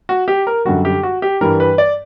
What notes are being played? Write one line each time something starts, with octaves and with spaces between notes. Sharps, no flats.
F#4
G4
A#4
F#2 D3 G3 F#4
G4
F#4
G4
G2 E3 G3 A#4
B4
D5